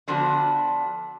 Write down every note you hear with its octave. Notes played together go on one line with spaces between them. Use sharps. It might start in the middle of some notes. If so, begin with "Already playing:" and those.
D3 F3 B3 D4 F#4